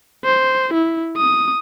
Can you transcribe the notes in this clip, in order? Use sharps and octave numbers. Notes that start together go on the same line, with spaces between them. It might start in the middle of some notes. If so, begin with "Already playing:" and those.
C5
E4
D#6